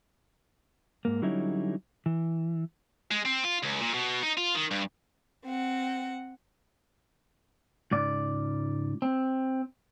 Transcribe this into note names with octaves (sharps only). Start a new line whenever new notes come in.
G#2 A#3
D3 F#3 G3 C#4 D#4 E4
E3
G#3
C4
F4
C#2
A#2
B2
D#4
F4
D#3
G2
C4 F#5
C#2 G#2 D5
C4